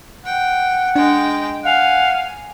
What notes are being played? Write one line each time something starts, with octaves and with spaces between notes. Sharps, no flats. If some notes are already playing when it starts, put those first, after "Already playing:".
F#5 G5
G#3 D4 G5
F5 F#5 G#5